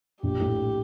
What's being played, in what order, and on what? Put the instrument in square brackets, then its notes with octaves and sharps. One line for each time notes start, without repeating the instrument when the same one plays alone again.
[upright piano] A#1 [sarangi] G4
[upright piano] A2